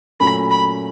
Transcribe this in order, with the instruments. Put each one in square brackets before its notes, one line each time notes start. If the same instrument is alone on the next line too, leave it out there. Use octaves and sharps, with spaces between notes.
[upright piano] A#2 F#3 A3 C#4 [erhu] B5
[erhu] B5